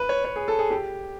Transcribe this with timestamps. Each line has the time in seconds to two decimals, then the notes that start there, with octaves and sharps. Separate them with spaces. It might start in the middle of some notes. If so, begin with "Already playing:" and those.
Already playing: B4
0.09 C#5
0.24 C#5
0.36 G#4
0.48 A4
0.59 G#4
0.71 G4